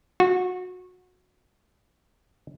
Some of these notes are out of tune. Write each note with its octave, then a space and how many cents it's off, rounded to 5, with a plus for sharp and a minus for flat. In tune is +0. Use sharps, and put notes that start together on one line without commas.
F#4 -25